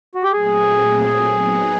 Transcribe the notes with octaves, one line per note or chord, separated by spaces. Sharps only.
F#4
G4
A#2 F#3 A3 C4 G#4
F#3 B3 D#4